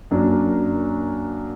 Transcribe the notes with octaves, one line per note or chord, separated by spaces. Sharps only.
F#2 F#3 A#3 D4